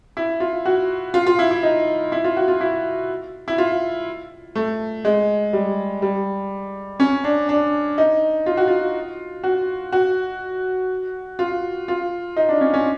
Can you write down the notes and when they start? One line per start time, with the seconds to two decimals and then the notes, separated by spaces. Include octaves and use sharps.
0.17 E4
0.40 F4
0.65 F#4
1.14 F4
1.27 F4
1.39 E4
1.51 E4
1.63 D#4
2.12 E4
2.24 F4
2.37 F#4
2.48 F4
2.61 E4
3.48 E4
3.58 F4
4.55 A3
5.05 G#3
5.53 G3
6.02 G3
7.00 C#4
7.24 D4
7.49 D4
7.98 D#4
8.46 F4
8.57 F#4
8.68 F4
9.44 F#4
9.92 F#4
11.39 F4
11.88 F4
12.37 D#4
12.49 D4
12.61 C#4
12.74 C#4